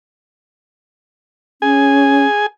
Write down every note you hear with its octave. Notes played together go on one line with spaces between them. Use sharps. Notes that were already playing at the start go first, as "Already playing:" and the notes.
C#4 G#4 G#5